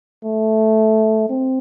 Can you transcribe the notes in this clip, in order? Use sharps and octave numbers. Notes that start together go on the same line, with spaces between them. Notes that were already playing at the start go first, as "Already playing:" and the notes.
A3
C4